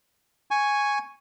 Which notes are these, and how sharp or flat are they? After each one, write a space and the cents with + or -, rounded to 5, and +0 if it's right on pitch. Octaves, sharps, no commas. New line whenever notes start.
G#5 +0 C#6 +0